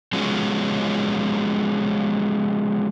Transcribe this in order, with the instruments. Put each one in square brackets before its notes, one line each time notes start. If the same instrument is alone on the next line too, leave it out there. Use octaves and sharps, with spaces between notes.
[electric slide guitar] F3 F#3 G#3 B3 C#4